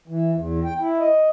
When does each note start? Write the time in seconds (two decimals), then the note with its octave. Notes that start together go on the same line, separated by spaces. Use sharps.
0.08 E3
0.33 E2
0.64 G5
0.79 E4
0.99 D#5